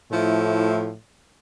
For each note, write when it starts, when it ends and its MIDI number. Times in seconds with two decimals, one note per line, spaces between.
0.12 0.96 45
0.12 0.89 53
0.12 0.89 57
0.12 0.89 64